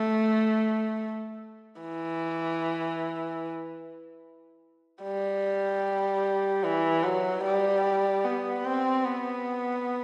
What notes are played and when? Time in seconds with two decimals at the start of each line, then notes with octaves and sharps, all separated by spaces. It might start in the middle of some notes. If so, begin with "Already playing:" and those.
Already playing: A3
1.81 E3
5.03 G3
6.64 E3
7.04 F#3
7.44 G3
8.25 B3
8.65 C4
9.05 B3